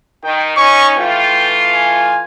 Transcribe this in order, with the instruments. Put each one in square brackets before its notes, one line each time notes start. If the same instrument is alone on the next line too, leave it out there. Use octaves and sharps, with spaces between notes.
[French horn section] D#3 [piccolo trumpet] G5
[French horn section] C#4 D#4 [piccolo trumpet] C#6
[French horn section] E3 A3 F4 [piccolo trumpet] G5
[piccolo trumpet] G#5